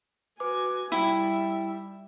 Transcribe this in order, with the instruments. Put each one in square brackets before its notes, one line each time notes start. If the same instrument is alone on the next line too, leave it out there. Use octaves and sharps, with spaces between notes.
[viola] F#4 G#5 [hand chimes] B4 D6
[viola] G3 E5 [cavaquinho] E4 [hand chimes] G5 E6